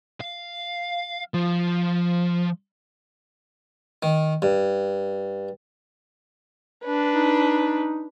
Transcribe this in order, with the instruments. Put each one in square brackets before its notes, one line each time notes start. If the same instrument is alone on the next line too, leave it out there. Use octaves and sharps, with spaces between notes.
[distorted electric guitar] F5
F3
[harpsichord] D#3
G2
[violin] D4 B4
[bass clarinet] D#4